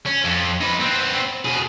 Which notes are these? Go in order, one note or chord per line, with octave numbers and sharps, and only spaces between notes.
C#4
F2
D#4 B4
B3 C4
B2 G#4